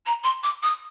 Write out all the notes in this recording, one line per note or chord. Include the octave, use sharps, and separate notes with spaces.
A#5
C6
D6
D#6